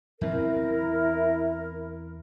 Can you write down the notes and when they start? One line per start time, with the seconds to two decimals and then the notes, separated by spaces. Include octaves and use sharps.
0.21 E2 C4 E4 A#4